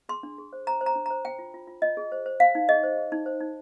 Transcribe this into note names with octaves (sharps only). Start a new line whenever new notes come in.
G#4 C6
D4
G#4
C5
C5 A#5
C5
A#5
D4
C5 A#5
C5 G5
F4
F4
F4
F4 D#5
G#4
C5
C5
C5 F5
D#4
G#4 D#5
C5
G#4
D#4
C5
D#4